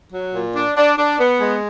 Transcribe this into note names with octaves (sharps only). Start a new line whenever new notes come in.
F#3
A#2
D4
D4
D4
B3
G#3